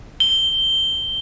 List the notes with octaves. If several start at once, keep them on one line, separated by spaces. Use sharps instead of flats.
G7